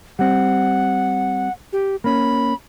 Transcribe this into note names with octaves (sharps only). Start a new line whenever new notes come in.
G3 C4 F#5
G4
A#3 C#4 B5